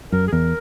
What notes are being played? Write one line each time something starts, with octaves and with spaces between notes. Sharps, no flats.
F#2 A#4
G#4
E2 A#4